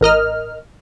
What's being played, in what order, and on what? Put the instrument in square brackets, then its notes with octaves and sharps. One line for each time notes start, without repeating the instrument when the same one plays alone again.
[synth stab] A1 A#4 D#5 F6